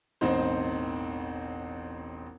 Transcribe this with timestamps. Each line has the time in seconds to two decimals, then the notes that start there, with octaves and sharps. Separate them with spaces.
0.21 E1 A1 C4 D#4 C5